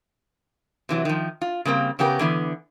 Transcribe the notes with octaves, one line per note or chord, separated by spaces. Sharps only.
C3 E3 F#3
D#3 F3
F4
C#3 G3 A#3 C4
C#3 B3 C#4 G4 A#4
D3 E3 B3